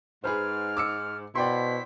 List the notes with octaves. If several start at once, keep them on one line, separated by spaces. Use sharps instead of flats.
G#2 G#4 B4 C5 F6
D6 E6 C#7
B2 E4 F#4 C5 D5 G5 C6 B6